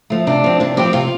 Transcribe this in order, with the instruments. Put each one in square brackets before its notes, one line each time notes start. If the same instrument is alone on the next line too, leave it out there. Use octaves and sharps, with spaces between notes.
[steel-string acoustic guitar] F3 A3
C3 D4
F3 C4
C3 D4
F3 C4 G4
C3 F4